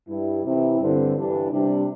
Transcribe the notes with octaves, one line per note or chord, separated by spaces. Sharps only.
G2 G3 E4
C3 E3 C4 E4
G2 D3 C4
G2 E3 G3 D4
C3 G3 D4